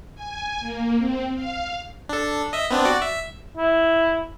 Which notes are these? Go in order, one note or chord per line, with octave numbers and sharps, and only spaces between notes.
G#5
A#3
C4
F5
D4 A4
D#5 E5
B3 C4 D4
F#4 D5
E5
E4